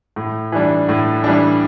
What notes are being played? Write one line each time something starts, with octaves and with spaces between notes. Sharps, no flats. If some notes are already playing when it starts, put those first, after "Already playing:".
A2
E3 G3 D4
A2
E3 G3 D4